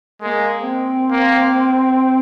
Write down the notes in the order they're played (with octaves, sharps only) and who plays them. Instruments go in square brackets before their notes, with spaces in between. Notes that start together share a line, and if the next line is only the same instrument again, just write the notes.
[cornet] G#3 [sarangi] A#3
[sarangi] C4
[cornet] A#3